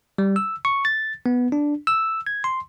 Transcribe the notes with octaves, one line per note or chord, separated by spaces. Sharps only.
G3
E6
C#6
A6
B3
D4
E6
G#6
C6